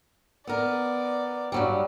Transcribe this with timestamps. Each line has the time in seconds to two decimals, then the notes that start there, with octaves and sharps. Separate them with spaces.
0.47 B3 A#4 D5
1.52 G2 F#3 G3